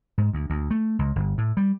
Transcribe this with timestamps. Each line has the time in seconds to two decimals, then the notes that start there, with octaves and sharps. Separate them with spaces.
0.18 G#2
0.33 D2
0.50 D2
0.71 A3
0.99 C#2
1.16 G1
1.38 A2
1.57 G3